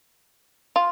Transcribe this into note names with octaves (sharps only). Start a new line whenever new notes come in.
F4